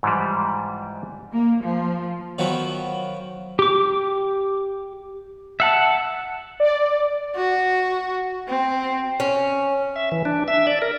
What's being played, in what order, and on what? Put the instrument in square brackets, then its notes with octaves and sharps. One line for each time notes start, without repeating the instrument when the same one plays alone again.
[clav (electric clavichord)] G#2 E3 F3 G3
[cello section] A#3
F3
[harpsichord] D#3 F3 F#3 B3
[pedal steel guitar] G4 D6
E5 F#5 A5
[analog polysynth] D5
[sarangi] F#4
C4
[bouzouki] C#4
[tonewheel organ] E5
E3
D4
E5
D5
A#4